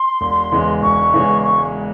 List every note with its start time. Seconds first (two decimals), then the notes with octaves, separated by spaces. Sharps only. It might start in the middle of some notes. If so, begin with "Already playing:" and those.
Already playing: C6
0.21 E1
0.52 E2 C#3 E3 G#3
0.82 E1 C#6
1.13 E2 C#3 E3 G#3
1.44 C#6